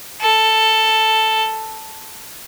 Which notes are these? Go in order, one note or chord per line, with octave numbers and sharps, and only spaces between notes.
A4